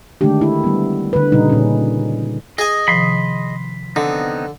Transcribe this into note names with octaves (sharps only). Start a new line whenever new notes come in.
D3 D#3 G#3 A3 D4 G4
E4
G3 B3
D3 B4
A#2 C#3 G3 D#4
A#2 C#4
G#4 D#5 G#5
C3 D#3 F3 B5 C6
D3 B3 C4 D#4